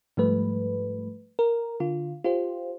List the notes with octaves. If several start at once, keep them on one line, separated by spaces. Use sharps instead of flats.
G#2 F3 G3 A3 B4
A#4
D3 F4
F4 G4 C5